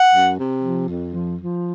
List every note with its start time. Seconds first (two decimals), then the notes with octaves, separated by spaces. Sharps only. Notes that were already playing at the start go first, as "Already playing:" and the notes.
Already playing: F#5
0.11 F#2
0.37 C3
0.63 F3
0.88 F2
1.14 F3
1.40 F3